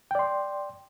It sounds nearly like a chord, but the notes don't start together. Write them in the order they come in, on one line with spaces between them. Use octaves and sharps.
G5 D5 C6